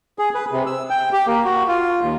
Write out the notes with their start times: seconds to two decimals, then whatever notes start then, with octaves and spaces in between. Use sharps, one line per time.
0.19 G#4
0.35 B4
0.52 C3
0.66 E6
0.90 G5
1.12 G4
1.27 A#3
1.44 F#4
1.68 F4
2.01 D#2